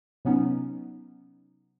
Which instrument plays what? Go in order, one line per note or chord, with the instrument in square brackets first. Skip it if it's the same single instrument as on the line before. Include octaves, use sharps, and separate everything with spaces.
[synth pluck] C3 F#3 B3 C#4 D#4